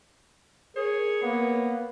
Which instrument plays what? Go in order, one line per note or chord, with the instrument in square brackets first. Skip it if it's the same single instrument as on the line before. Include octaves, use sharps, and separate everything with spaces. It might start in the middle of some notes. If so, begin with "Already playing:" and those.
[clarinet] G#4 [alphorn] A#4 [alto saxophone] C#5
[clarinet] A#3 [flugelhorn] B3